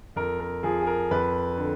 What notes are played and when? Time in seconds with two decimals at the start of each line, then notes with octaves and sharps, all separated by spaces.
0.16 F2 A#4
0.40 A#4
0.63 F3 G#4
0.81 G#4
0.87 A#4
1.11 F2 B4
1.57 D3